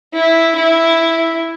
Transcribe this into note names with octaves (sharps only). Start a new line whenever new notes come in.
E4
E4